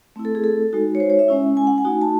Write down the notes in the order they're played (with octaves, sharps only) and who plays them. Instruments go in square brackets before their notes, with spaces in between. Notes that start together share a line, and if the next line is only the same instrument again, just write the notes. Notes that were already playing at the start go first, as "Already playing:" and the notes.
[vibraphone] A3 C4 E4
A4
G#4
A4
G#3 D#4 F#4
C#5
C5
C#5
E5
G#3 C#4 E4
G#5
F#5
G#5
A3 D#4 F#4
A5